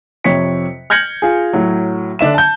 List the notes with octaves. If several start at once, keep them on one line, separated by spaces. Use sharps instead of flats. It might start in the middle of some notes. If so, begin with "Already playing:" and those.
F2 C3 C#5 B6 C#7
F6 G6 G#6 A#6 C#7 F#7
F4 G#4
A2 F#3
D3 D4 E5 E7
A5 G6